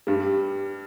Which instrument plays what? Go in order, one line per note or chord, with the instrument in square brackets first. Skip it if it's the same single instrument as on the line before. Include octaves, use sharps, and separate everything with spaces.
[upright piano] G2 G3